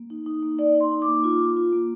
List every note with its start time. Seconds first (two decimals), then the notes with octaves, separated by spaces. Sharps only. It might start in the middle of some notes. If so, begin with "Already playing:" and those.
Already playing: A#3
0.10 D#4
0.26 D#4
0.43 A#3
0.59 D#4 D5
0.75 D#4
0.81 C6
0.91 D#4
1.02 D6
1.07 A#3
1.24 F4
1.40 F4
1.57 F4
1.73 A#3